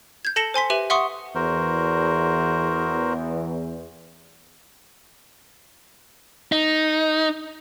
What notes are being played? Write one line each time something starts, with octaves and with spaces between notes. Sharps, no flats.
G6 G#6
A4 A5 A#6 C#7 E7 G7
C5 G#5 C6 B6
G4 B4 E5 D#7 F#7
E5 F#5 C6 C#6 D#6 C#7
E2 F#4 A#4 C5
D#4